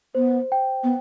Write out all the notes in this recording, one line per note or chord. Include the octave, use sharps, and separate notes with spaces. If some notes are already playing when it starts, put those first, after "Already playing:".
B3 C5
G5
B3